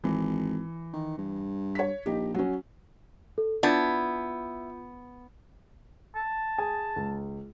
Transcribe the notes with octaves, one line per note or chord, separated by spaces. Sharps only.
G#1 E3
D#3
G2
C#5 B6
A#1 D#4 G4
F#3 C#4
A4
B3 D4 E4 F4 A5 G6
A5
G#4 G#5
C#2